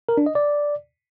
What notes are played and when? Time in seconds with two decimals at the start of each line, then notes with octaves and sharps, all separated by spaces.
0.09 A#4
0.17 D4
0.26 D#5
0.35 D5